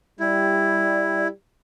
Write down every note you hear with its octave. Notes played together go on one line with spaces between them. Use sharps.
G3 E4